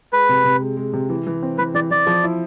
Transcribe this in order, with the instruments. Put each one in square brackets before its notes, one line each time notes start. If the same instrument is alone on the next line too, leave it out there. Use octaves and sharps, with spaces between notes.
[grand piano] G#3 [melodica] B4
[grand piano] C3
C3
G#3
G#3
C3
E3
E3
C4
[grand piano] E3 [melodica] B4
[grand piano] E3 [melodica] D5
[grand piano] E3 [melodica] D5
[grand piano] F3
E4